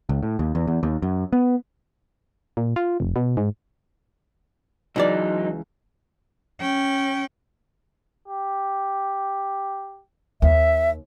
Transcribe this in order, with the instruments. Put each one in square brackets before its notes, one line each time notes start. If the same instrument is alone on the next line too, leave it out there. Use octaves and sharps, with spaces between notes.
[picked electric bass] C#2
A2
D#2
E2
E2
D#2
F#2
B3
[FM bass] A#2
F4
F1
B2
G#2
[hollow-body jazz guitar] C#2 E3 D5 [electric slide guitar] F#3 D#4
[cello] C#4 G5
[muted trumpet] G4
[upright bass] D#2 [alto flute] E5